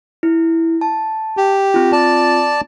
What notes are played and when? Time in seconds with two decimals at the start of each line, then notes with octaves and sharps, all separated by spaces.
0.23 E4
0.81 A5
1.37 G4
1.74 C4 F4
1.92 D5 A5